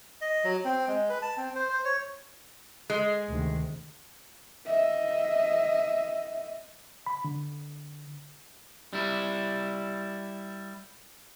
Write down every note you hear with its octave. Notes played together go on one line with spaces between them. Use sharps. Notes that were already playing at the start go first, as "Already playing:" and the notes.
D#5
F#3
C4
G#3
B4
A5
C4
C5
C5
C#5
G#3
D2 C3 D#3
D#5 E5
B5
D3
G3 E4